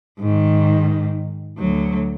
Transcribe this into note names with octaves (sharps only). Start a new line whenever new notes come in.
G#2 D#3
D2 F#3